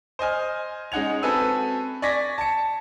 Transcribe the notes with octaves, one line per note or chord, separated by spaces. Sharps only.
C5 D#5 G#5 F6
G#3 C#4 D#4 F#5 G#6 F7
C4 F#4 A4 B4 G#5 E6
D5 G#5 C#6 G#6 A#6 B6
A5 C#7